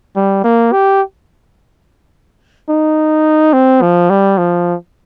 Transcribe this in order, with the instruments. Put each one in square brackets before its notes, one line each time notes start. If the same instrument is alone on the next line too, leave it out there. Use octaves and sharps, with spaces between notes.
[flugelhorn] G3
A#3
G4
D#4
C4
F3
G3
F3